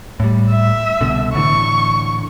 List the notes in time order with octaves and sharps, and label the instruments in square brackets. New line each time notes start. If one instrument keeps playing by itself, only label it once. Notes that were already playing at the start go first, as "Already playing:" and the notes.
[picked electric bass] A2 G3
[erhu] E5
[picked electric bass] C2 B2 D3
[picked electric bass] A2 D3 E3 [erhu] C#6